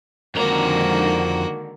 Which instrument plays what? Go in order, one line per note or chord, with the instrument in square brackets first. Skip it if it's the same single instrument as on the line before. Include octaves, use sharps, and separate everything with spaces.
[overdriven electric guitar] F2 A#5 [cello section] D3 D#3 G#3 [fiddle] A#3 F#4